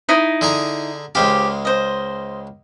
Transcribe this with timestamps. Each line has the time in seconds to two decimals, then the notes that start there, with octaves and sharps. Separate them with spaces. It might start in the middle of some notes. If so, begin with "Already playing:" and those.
0.09 D#4 E4 D#5
0.41 D3 G#4 A#5
1.15 C#2 G#3 G4 C5 F5
1.65 C5 D#5